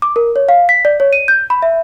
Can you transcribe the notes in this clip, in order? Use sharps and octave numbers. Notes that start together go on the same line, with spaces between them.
D6
A#4
C#5
F5
B6
D5
C#5
D#7
G6
B5
E5